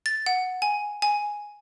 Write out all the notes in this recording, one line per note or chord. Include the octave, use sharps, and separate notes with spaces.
A6
F#5
G#5
G#5